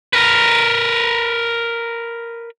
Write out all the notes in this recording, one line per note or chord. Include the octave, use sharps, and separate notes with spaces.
A#4 B4